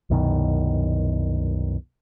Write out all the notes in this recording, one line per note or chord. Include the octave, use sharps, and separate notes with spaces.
C2 F#2 B2 D#3